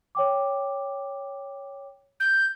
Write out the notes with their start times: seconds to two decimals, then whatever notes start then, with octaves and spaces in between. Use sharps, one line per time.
0.15 C#5 G5 D6
2.20 G6